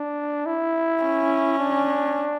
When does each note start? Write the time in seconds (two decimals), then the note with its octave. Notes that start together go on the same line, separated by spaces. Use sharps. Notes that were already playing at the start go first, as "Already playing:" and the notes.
Already playing: D4
0.46 E4
1.02 C#4
1.59 D4